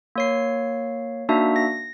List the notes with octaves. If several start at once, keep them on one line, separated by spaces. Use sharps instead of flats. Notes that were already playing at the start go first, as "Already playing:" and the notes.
A#3 C#5 C7
A#3 D4 D#4 F#4 E5
A#6